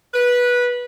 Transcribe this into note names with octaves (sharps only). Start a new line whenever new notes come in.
B4